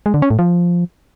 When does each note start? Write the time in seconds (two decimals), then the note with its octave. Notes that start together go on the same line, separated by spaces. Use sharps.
0.06 G#3
0.14 D3
0.22 C#4
0.30 A2
0.39 F3